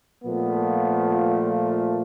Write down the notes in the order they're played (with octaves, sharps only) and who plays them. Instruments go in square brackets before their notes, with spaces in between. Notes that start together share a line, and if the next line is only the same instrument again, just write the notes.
[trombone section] A#2 F3 A3 B3